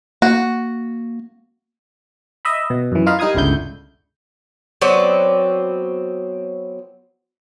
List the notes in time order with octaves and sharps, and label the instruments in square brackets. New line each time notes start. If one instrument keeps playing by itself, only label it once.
[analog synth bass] A#3 [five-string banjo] F#4
[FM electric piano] D#5 E5 B5
B2
F#2 E3
D#4 F4 D#5 F5 B5
G3 D#4 A#4 F5 D#6 G#6
G1 C#2 D3 E4 G6
[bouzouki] F#3 B3 C4 D5